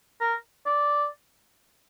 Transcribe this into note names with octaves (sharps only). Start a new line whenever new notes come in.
A#4
D5